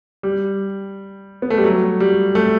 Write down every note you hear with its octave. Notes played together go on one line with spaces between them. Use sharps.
G3
B3
A3
G3
F#3
G3
A3